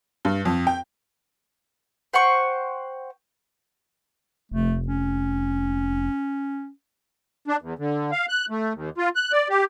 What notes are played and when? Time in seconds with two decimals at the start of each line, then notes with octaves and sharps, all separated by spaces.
0.25 G2
0.45 F2
0.67 G5
2.13 C5 F#5 G5 C#6
4.52 F1 A3
4.88 C#4
7.48 D4
7.62 E2
7.79 D3
8.12 F5
8.29 F#6
8.50 A3
8.74 D#2
8.98 F4
9.15 F#6
9.32 D5
9.49 G4